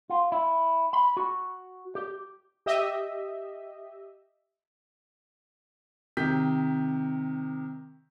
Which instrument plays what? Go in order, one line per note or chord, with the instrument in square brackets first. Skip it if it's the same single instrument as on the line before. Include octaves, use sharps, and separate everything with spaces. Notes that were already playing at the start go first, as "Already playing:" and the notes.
[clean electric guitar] F4
E4
B5
F#4
G4
[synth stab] G4 D#5 E5
[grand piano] C3 D#3 G6 B6